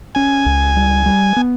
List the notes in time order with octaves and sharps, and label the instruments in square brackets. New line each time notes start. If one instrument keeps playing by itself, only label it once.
[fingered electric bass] C#4 [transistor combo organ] G#5
[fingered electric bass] C#2
G3
G3
B3